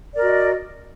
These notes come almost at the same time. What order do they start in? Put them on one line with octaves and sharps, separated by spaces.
D5 A#4 F#4 D#5